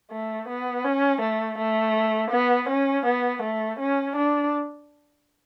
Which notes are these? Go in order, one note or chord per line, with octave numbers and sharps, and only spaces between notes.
A3
B3
C#4
A3
A3
B3
C#4
B3
A3
C#4
D4